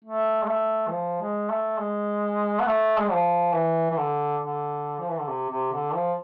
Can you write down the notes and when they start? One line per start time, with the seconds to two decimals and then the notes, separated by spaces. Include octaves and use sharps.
0.05 A3
0.43 G#3
0.48 A3
0.87 E3
0.91 F3
1.21 G#3
1.50 A3
1.79 G#3
2.60 B3
2.67 A3
2.99 G#3
3.11 F3
3.54 E3
3.90 E3
3.97 D3
4.42 D3
5.00 F3
5.10 E3
5.19 D3
5.28 C3
5.50 C3
5.73 D3
5.94 F3